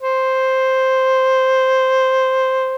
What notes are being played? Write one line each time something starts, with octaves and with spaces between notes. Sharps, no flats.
C5